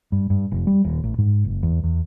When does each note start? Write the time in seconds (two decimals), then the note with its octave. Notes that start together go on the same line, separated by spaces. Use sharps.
0.12 G2
0.30 G2
0.52 F1
0.67 G3
0.84 D#1
1.04 A1
1.18 G#2
1.45 F#1
1.63 E2
1.83 E2